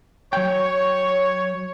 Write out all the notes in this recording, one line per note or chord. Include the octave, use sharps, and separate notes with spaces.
F#3 C#5 G5